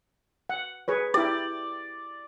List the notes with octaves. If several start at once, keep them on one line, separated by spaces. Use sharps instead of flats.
F#5
G#4 B4 C#5
E4 G4 D5